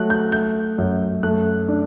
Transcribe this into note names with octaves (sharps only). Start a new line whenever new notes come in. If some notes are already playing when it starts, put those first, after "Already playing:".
Already playing: F#3 A3 F#6
G6
A3 G6
F#2
A3 F#6
D4